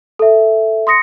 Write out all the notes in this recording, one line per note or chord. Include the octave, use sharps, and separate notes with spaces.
A4 E5
C6 D#6 A#6 C#7